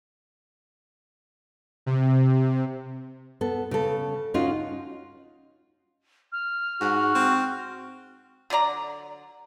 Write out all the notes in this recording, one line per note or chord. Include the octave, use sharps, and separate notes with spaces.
C3
B3 A4
C#3 A4
C#4 D#4 F4 F#4
F6
G#2 F#4
C4
D3 F#3 D5 A#5